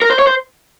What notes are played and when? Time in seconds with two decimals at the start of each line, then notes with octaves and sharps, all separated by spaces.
0.02 A#4
0.10 C5
0.19 C#5
0.27 C5